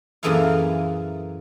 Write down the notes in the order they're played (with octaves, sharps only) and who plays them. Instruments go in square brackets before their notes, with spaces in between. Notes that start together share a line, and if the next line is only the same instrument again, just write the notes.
[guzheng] F#2 A#2 E3 G#4 A4 F5